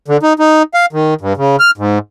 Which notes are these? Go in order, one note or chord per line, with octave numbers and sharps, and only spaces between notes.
D3
D#4
D#4
F5
D#3
G2
C#3
F6
G#2